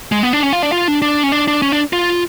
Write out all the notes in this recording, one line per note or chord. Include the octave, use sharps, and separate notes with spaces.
G#3
B3
D4
C#4
F4
D4
F4
D4
D4
C#4
D4
D4
C#4
D4
F4